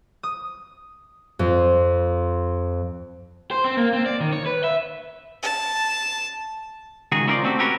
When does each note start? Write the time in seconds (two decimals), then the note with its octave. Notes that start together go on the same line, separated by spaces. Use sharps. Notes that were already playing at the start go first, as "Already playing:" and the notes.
0.23 D#6
1.39 F2
3.51 C5
3.64 C4
3.77 A#3
3.93 C4
4.06 D5
4.20 D#3
4.33 C#5
4.46 B4
4.64 E5
5.43 A5
7.12 C#2 D#3 F#4 G#4
7.27 C#4 E4 F4 A#4 C5 D5
7.44 A3 C4 D4 F#4 G4
7.59 C#4 F#4 G4 A#4 B4 C#5